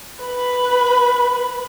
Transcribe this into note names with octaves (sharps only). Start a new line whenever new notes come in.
B4 B5